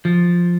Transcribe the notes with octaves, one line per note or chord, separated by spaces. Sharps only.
F3